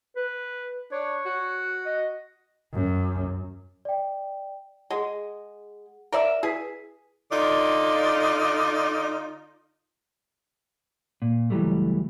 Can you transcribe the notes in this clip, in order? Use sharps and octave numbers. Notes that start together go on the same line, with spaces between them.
B4
D4 C#5
F#4
D#5
F#2
D5 G5
G#3 G#4 F#5
A#4 D5 E5
E4 G#4 B4 B6
D3 D#4 F4 D5
A#2
C#2 E3 F#3 G3 A3